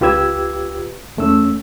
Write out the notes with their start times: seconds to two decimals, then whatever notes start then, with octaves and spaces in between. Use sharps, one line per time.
0.01 C#2 F4 G4 B4 E6 G#6
1.17 E2 A3 C#4 E6